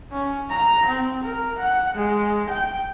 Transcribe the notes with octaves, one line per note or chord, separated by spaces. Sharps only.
C#4
A#5
C4
A#4
F#5
G#3
G5